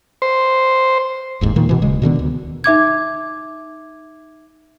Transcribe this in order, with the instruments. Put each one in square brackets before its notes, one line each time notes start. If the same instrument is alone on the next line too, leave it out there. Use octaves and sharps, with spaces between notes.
[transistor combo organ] C5
[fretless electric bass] F1 D#2 G#2
A#2 D#3 A#3
B2 E3
D1 C#3 G#3
B2 D3 D#3 B3
D2
[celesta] D#4 E5 D6 G#6